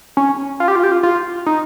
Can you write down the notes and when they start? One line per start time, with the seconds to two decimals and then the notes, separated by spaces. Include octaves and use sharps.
0.17 C#4
0.60 F4
0.68 G4
0.76 F4
0.83 G4
0.92 F4
1.03 F4
1.46 D#4